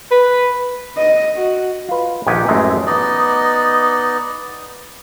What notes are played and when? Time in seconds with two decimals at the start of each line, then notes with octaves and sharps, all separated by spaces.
0.11 B4
0.97 D#5
1.36 F#4
1.89 F4 B4
2.27 A#1 D#3 G4 F#5 G#5
2.48 A1 F#2 G#3 A3
2.86 B3 D#4 D5 D#5